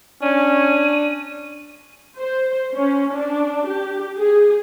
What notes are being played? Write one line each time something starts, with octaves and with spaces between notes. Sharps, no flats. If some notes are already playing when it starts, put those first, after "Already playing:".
C#4 D4 D#7
C5
C#4
D4
G4
G#4